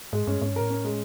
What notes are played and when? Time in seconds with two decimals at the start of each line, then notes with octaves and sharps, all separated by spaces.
0.13 G#2 G#3
0.27 G2 C#4
0.41 G#2 C#4
0.51 G2
0.56 A2 A#4
0.70 C#4
0.84 G#3